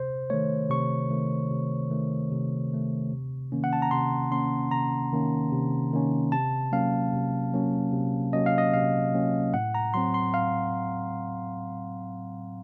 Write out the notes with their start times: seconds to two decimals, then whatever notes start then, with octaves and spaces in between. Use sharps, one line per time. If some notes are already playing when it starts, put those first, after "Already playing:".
Already playing: C3 C5
0.30 D#3 A3 C#5
0.70 C3 C#6
1.10 D#3 A3
1.51 C3
1.90 D#3 A3
2.31 C3
2.71 D#3 A3
3.11 C3
3.52 D#3 A#3 C#4
3.64 F#5
3.73 A5
3.82 A#5
3.91 C3 C6
4.32 D#3 A#3 C#4 C6
4.71 C3 A#5
5.12 D#3 A#3 C#4
5.52 C3
5.93 D#3 A#3 C#4
6.32 C3 A5
6.72 F#3 A#3 C#4 F5
7.13 C3
7.53 F#3 A#3 C#4
7.93 C3
8.33 F#3 A#3 C#4 D#5
8.46 F5
8.58 D#5
8.73 C3 F5
9.14 F#3 A#3 C#4
9.54 A2 F#5
9.75 A#5
9.94 F#3 C4 C6
10.14 C6
10.34 A2 F5